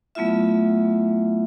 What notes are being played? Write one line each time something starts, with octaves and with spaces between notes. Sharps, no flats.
F#3 A3 B3 E4 F4 E5